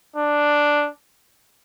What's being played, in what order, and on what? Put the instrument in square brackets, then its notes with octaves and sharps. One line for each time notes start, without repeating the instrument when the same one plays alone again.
[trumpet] D4